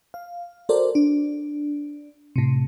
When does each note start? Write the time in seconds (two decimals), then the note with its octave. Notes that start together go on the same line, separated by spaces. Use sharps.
0.14 F5
0.69 F#4 A4 A#4 C5 D5
0.95 D4
2.36 A2 C3